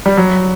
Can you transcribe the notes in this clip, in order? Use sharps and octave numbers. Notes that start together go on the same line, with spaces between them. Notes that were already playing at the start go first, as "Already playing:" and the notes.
G3
F#3